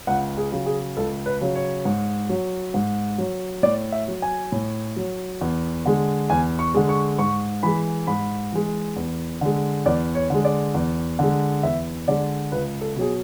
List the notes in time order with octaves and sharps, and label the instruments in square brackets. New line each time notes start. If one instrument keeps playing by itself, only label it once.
[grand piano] C#2 F#5
G#4
C#3 F#3
G#4
C#2 A4
B4
C#3 F#3
C#5
G#2
F#3
G#2
F#3
A2 D5
E5
F#3
G#5
A2
F#3
E2
D3 G#3
E2 G#5
C#6
D3 G#3
C#6
G#2 C#6
E3 G#3 B5
G#2 B5
E3 G#3
E2
D3 G#3
E2 D5
C#5
D3 G#3
D5
E2
D3 G#3
E2 E5
D3 G#3 D5
C#2 B4
A4
B2 F#3 G#4